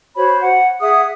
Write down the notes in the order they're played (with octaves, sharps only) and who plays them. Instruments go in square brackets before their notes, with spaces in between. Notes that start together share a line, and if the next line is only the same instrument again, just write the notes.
[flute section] F#4 C5 C#5 B5
F#5
G#4 E5 F#5 D#6